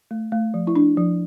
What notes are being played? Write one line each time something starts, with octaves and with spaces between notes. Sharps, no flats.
A3
A3
F3
E4
D4
F3